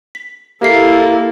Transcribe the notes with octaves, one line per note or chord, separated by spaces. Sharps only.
B6
A#3 E4 G4 A4 E5 C7